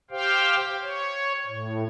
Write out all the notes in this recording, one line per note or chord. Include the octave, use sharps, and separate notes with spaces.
G4 C5 F5 G5
C#5
A2